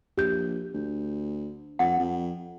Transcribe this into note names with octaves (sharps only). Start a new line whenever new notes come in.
A#1 G4 G6
D2
F2 F#5
F2